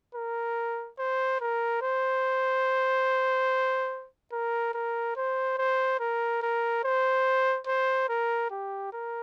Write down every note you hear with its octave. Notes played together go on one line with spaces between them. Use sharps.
A#4
C5
A#4
C5
A#4
A#4
C5
C5
A#4
A#4
C5
C5
A#4
G4
A#4